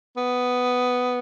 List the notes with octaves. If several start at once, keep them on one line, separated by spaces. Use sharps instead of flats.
B3